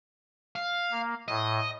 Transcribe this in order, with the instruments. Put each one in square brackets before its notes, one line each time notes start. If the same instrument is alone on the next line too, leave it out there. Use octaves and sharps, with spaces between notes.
[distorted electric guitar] F5
[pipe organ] A#3
[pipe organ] A2 [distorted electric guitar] D#5